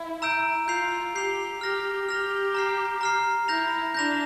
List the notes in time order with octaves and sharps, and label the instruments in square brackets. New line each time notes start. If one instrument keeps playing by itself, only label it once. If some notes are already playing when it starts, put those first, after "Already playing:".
Already playing: [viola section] E4
[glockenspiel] A#5 E6 G6 D7
[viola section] F4 [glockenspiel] G6 C7 F7
[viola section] G4 [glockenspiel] G6 C7 F7
[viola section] G4 [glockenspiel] F6 A#6 F7
[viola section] G4 [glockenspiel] F6 A#6 F7
[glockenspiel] A#5 F6 C7
A#5 F6 C7
[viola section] E4 [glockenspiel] G6 A#6 F7
[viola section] D4 [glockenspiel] G6 A#6 F7